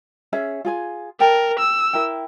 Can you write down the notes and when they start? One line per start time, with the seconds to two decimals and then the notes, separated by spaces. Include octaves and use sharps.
0.33 C#4 G#4 E5
0.65 F4 G#4 G#5
1.20 A4 A#4 G5 A5
1.59 E6
1.93 E4 A#4 G5